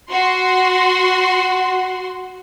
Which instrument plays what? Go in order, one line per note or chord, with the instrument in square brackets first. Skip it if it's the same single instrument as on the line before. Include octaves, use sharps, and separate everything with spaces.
[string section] F#4 C6